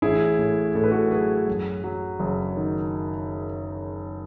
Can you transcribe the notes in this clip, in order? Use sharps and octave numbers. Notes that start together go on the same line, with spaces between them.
A1 E4 G#4
A2
A2 A4
B4
F#4 A4
F#3 G#4 B4
F#2
F#3
F#1
D#3